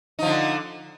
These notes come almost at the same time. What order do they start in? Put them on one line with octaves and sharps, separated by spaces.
D#4 F3 D3